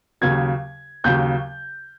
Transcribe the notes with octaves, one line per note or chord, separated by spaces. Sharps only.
D#2 C#3 F#3 G#6
D#2 C#3 F#3 G6